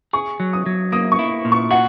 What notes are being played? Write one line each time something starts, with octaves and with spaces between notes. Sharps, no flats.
G#4 C#6
F#3
D#6
F#3
A#3 D#6
C#6
E4
A#2
C#6
F#4 F#5